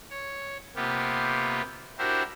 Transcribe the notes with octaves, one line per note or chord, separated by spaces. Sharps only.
C#5
C3 A#3 B3 F4 G4
D4 E4 F#4 G4 A#4 C5